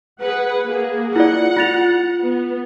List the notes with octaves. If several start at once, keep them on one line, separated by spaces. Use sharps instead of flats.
G#4 B4 F#5
A#3 G#4
E4 F4 D5 F#5
F4 A6 F7
B3